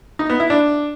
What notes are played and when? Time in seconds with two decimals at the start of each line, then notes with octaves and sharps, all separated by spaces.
0.19 D#4
0.30 B3
0.40 E4
0.50 D4